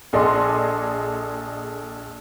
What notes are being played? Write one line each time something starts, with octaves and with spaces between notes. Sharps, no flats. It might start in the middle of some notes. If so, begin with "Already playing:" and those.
A#1 G#4 A4 D5 D#5 C6